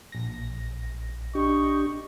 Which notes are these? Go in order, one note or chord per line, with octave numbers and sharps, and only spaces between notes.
A#1 A#6
D4 G4 D#5 C#6